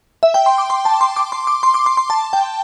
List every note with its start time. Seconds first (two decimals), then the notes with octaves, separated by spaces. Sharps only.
0.23 E5
0.34 G5
0.46 C6
0.58 D6
0.70 C6
0.85 A5
1.01 C6
1.16 D6
1.32 C6
1.47 D6
1.63 C6
1.74 D6
1.86 C6
1.97 C6
2.10 A5
2.33 G5